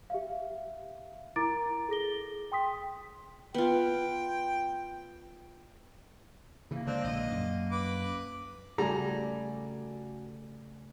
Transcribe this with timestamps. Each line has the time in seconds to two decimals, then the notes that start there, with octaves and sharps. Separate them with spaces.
0.10 G4 E5 F5
1.36 E4 A#4 A#5 D6 A6 D7
1.89 G#4 A4 A#6 G7
2.52 G5 C6 D#6 B6
3.54 B3 F4 G5
6.71 C#3 E3 A#3
6.87 D3 G#3 C4 D4
7.04 A#1 D#5
7.31 F#2
7.72 B4 D6
8.78 C#3 G3 A3 F#4 A4 D5 G#5 A#5